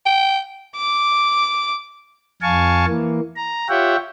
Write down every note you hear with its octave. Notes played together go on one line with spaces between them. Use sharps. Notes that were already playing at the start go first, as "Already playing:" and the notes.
G5
D6
F2 F5 G#5 A5 C#6
E3 A#3
A#5
F4 G4 C#5 E5 F#5 G5